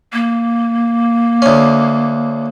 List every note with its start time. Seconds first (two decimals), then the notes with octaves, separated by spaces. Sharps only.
0.13 A#3
1.42 D2 C#4